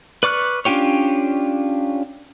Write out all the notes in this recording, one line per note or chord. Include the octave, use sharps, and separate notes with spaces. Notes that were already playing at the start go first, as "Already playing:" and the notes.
B4 D5 C#6 F6 F#6
C#4 D4 F4 G4 C#5